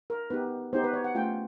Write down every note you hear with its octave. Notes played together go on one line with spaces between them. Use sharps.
A#4
B3 D#4 G4 B4
B3 D#4 G4 C5
B4
C#5
F#5
A3 C#4 F4 G5